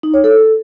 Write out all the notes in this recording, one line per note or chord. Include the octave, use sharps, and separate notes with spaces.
D#4
C#5
A4